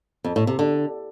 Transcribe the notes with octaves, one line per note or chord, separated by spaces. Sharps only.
F2
A2
C3
D3